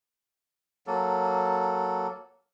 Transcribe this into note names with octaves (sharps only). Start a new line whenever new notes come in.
F#3 A#3 A4